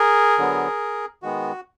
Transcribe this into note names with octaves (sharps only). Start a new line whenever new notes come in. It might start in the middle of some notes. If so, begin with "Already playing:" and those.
Already playing: G#4 A#4
D3 F#3 B3
D#3 G#3 B3 F#4